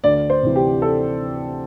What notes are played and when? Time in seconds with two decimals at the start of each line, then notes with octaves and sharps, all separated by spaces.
0.04 D2 D5
0.30 C5
0.43 C3 E3
0.56 G4
0.82 A4